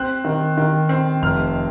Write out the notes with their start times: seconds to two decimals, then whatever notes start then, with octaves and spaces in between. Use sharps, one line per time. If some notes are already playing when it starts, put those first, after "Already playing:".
Already playing: C4 F#6
0.25 D#3
0.57 D#3
0.89 C4
1.22 F1 F6